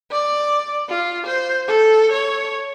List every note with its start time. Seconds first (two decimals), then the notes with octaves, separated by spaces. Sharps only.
0.12 D5
0.89 F4
1.27 C5
1.68 A4
2.12 C#5